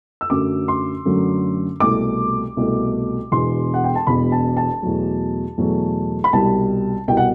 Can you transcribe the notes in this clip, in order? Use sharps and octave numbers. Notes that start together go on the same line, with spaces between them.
E6
F#2 D3 F#3 A3 D6
C6
F#2 D3 F#3 A3
C2 B2 A3 D6
C2 B2 A3
E1 E2 B2 C6
F#5
G5
A5
E1 E2 B2 B5
A5
A5
E2 B2 F#3 A3
E2 B2 F#3 A3
B5
C2 B2 G3 A5
C2 B2 G3 G5
F#5